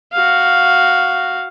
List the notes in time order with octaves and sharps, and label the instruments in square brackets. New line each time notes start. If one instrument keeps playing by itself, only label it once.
[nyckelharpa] F#4 F5